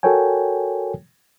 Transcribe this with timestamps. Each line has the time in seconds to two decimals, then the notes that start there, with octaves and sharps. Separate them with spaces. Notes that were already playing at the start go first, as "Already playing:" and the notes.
0.03 F#4 A4 A#4 C#5 G5 G#5